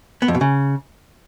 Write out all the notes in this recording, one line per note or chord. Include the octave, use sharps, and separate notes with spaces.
B3
F2
B2
C#3